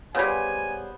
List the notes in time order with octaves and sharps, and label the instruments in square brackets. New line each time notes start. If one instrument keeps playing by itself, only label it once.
[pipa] C#3 G3 [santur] B3 C5 [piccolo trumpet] G#5